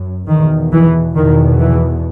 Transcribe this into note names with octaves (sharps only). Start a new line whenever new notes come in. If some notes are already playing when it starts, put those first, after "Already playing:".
Already playing: F#2
E2 B2 D#3
E3
E2 B2 D#3
E3